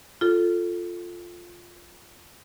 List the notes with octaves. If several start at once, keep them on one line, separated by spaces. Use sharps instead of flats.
F4 A4